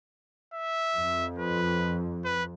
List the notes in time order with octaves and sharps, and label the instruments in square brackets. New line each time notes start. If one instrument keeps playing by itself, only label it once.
[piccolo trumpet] E5
[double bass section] F2
[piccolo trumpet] B4
B4